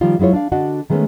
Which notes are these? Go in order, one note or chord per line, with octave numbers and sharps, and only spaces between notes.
D#3 F3 G3 F4
F#3 G#3 E4 F4 C#5
D4 F5
D3 D4 F#4 D#5 F#5
D#3 G#3 A3 B3 C#4